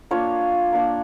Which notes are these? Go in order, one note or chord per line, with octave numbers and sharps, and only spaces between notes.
A#3 D4 F4 C#5
A#3 D4 F4